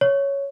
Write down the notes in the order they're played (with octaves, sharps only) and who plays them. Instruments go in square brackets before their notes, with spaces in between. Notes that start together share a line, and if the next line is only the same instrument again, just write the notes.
[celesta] C#5